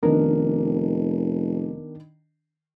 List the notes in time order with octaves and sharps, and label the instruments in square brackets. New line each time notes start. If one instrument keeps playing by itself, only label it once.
[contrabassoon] F1 [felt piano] D#3 D4 [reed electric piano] B3 A#4